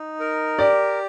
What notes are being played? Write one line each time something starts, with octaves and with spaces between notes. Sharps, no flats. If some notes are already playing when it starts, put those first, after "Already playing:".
Already playing: D#4
A#4
G4 D5